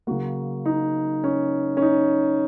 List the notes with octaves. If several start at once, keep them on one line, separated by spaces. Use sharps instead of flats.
C#3 F#3 A#3 F#4
D#4
C#4
C#4
D#4